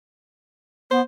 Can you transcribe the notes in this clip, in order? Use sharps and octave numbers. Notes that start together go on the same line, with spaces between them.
B3 C5